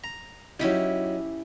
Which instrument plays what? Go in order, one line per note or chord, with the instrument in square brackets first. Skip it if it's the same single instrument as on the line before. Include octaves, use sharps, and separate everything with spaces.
[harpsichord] A#5
[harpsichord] F#3 D#4 [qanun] C#4 E4 G4